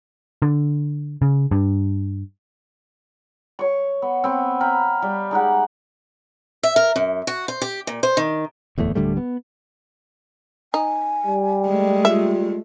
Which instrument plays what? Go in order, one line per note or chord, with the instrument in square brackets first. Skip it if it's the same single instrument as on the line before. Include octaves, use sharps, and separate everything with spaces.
[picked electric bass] D3
C#3
G2
[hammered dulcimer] C#5 C#6
B3
B3 C4
F5 G5 A#5 B5
G3
G#3 D#4 G4 F#5
[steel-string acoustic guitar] E5
A#4
F#2
F#4
C5
G4
A#2
C5
D#3
[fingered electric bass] D1 E2 A2 A3
D1 D3 G3 A3
B3
[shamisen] D#4 [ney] G#5
[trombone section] G3
[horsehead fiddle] G#3 A3
[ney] F4 [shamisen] E5